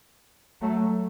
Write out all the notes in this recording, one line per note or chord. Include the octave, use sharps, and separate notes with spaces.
F#3 A3